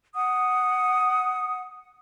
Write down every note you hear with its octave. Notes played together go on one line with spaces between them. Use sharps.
F#5 D#6